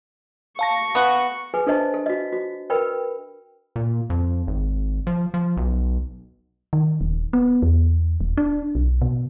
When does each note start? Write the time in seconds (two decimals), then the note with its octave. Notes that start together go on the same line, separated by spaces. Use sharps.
0.59 F5 A5 C#6 A#6
0.95 B3 F#4
1.54 G#4 B4 G#5
1.66 D4 A4 C5 D#5 A5
1.94 A4
2.06 F#4 D#5
2.32 F#4
2.70 A#4 B4 G5 B5
3.76 A#2
4.10 F2
4.47 G#1
5.07 F3
5.34 F3
5.57 B1
6.73 D#3
7.01 D#1
7.33 B3
7.62 E2
8.21 D#1
8.37 D4
8.75 B1
9.02 B2